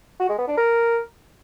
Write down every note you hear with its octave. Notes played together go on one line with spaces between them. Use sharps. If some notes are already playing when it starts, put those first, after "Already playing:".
F#4
G#3
B3
D4
A#4